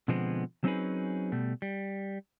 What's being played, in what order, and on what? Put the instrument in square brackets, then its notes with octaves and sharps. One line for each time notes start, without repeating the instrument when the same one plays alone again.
[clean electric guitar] B2 D3 F3 G#3 B3 C4
F#3 C4 C#4 D#4 G#4 B4
B2 G3 A3
G3